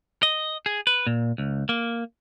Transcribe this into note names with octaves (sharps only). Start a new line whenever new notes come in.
D#5
G#4
B4
A#2
C#2
A#3